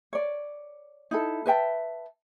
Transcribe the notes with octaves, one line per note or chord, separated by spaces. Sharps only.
C#5 D5
D#4 E4 A4
B4 E5 G5 A5